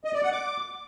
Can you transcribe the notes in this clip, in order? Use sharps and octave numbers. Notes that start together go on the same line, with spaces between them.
D#5
D5
F#5
D6